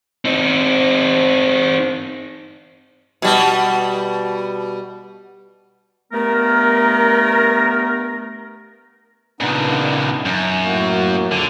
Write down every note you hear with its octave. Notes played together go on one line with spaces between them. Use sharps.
C4 D#4
B2 G3
G2 A3 B3 A#4
A#2 C#3 B3 D4 D#4
F#2
A2 A#3 F#4
E2 A#2 D3 G#5